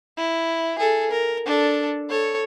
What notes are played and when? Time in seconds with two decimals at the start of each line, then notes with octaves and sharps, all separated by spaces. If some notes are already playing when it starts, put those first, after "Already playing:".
0.17 E4
0.79 G#4 A4
1.11 A#4
1.46 D4 A4
2.10 A4 C#5